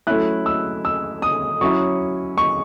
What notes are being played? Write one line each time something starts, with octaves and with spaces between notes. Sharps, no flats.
F#3 A3 C#4 E4 F#6
E6
E6
D#6
F#3 C#4 E4 C#6
C#6